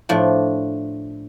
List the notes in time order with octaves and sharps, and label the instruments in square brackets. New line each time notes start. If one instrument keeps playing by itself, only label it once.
[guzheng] A2 F3 D4